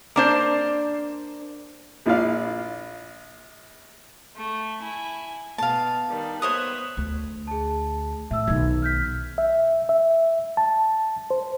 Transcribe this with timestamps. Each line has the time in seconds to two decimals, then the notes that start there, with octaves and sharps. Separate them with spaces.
0.16 A#3 D4 C5
2.06 A#1 E4 F4 D5 F5
4.35 A3
4.80 E4 G#5
5.58 B2 F5 A5
6.08 D#3 G3
6.42 B3 C5 C#5 E5 D#6 F#6
6.97 D2
7.47 G#4 A5
8.31 A2 E5 E6
8.47 B1 D#3 D#4 G#6
8.82 F6 G6 B6
9.38 E5
9.89 E5
10.57 A5
11.30 C5